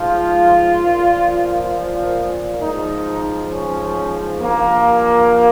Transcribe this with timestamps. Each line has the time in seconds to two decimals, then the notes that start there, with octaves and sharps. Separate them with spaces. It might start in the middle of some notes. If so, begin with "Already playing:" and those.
Already playing: G#2 F3 F4
0.82 A#2 F3
2.61 G#2 F3 D#4
3.51 C#4
4.41 G2 F3 A#3